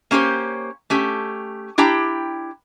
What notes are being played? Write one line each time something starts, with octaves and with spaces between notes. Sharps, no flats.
A#3 C#4 G4 C5 C#5
A3 C#4 G4
D4 E4 G4 G5 A#5